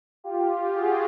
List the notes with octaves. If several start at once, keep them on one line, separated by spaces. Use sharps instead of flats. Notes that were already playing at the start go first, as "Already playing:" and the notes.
F4 G4
F#4 G#4